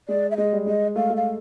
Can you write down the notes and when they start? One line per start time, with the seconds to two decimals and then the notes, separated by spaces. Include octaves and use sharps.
0.09 G#3 D5
0.31 E5
0.37 G#3 D#5
0.53 G3
0.66 G#3 D#5
0.96 A3 F5
1.10 A3
1.17 F5